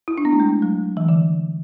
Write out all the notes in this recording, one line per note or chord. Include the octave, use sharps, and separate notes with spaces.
E4
D4
B3
A3
G#3
F#3
E3
D3